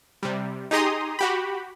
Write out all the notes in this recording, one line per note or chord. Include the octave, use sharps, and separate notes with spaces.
C3 G3
D#4 G4 G#4 A#5 C6 D#6
F#4 G4 B5